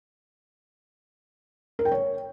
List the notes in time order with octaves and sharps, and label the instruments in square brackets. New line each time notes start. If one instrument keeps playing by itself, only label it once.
[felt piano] A#4
G5
C#5